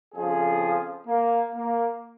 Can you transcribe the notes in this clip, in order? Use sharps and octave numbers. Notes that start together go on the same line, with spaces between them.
F2 C#3 F3 G#4
A#3
A#3